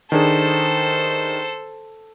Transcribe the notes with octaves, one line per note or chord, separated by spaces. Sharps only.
D#3 D4 G#4 A4 C5